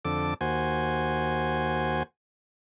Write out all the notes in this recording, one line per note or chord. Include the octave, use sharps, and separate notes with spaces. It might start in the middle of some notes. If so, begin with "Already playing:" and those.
F2 D3 A4 D6
D#2 F#4 C5 G#5